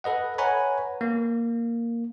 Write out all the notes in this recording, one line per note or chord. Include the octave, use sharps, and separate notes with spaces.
A4 B4 D#5 F#5
B4 C#5 F#5 G#5 A#5 B5
A#3